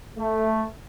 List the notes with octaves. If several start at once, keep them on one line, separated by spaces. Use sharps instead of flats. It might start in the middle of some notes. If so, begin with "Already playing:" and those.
A3